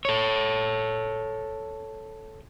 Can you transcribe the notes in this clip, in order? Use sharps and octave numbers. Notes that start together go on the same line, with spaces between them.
A4 C#5